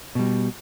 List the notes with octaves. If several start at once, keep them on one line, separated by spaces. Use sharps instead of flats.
B2 G3